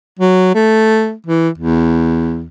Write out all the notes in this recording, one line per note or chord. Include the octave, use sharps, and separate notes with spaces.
F#3
A3
E3
E2